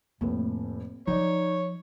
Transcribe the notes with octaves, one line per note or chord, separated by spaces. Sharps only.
F1 A2 A#3 C4
F3 D#4 C#5 D5